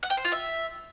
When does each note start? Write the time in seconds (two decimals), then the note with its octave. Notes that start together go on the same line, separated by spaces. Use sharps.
0.03 F#5
0.10 G5
0.17 C5
0.25 F4
0.32 E5